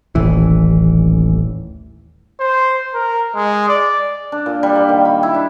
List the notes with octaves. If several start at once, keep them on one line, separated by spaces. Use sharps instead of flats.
D#1 A1 E3
C5
A#4
G#3
D5
D4
A#2
G3
A#3
D#3
B5
E4
D4